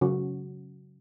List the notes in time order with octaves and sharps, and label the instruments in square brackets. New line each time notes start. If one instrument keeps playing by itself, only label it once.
[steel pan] C#3 F#3 C#4 F#4